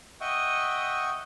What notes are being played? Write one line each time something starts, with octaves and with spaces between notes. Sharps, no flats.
D#5 E5 F#5 G5 C#6 D#6